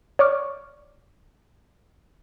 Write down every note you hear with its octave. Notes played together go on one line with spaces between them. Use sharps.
C#5 D5 C#6 D6 F6